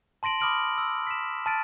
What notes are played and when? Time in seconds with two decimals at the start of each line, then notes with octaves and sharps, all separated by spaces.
0.23 A5 C6 A#6 D7 F#7
0.40 B5 D6 D#6 F6 D7 F#7
0.78 E6
1.07 B6 E7
1.46 A5 F6 A6 D7